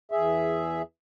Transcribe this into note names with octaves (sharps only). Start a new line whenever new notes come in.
E2 G#4 E5